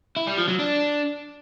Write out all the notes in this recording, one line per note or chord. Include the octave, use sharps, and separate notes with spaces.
E4
G3
F3
F#3
D4